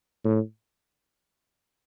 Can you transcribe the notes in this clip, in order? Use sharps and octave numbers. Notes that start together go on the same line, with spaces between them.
A2